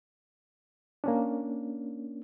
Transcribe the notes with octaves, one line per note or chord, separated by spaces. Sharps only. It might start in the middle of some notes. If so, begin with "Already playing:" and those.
A#3 C#4 D4